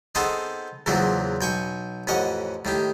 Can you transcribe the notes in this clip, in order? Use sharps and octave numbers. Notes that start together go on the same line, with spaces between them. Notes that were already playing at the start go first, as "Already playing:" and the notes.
B3 C4 D#4 G#4 A4 C5
E2 A#2 C#3 E3 F#3 C4
B1 G5 G#5 C#6
A1 F2 C#4 D#5 F#5
A2 D#3 G4